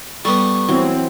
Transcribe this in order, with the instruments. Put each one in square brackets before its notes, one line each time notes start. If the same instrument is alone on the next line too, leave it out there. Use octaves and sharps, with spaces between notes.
[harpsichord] G3 B3 [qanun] A4 [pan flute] C#6
[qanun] E3 F#3 [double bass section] C4